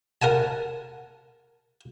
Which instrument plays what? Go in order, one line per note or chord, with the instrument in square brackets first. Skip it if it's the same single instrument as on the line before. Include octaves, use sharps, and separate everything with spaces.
[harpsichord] A#4 F#5 G#5 A5